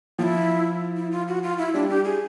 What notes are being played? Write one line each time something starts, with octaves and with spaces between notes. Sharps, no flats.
F3 E4 F4
E4
F4
F#4
F4
E4
G3 D4
G4
G#4